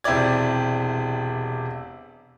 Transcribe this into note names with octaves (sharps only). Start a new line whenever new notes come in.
E1 C3 E4 G4 D5 G#6